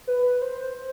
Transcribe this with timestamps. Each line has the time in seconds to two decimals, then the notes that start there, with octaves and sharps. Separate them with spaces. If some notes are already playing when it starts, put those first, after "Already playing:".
0.07 B4
0.42 C5